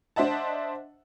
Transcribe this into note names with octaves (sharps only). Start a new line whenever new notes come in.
D4 C5 D#5 E5 F#5 A5